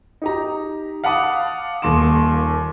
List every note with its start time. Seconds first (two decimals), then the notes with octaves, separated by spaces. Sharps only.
0.22 D#4 G4 A#5
1.04 F5 F#5 A5 B5 D6 D#6
1.82 D#1 D#2 C6 D6 E7